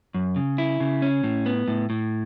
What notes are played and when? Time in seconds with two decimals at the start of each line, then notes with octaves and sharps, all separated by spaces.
0.14 F#2
0.36 C#3
0.58 E4
0.80 C#3
1.02 C#4
1.23 A2
1.46 B3
1.68 A2
1.90 A2